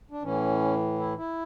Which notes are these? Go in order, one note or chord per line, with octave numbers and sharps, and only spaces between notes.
D4
A2 E3 C#4
E4
E4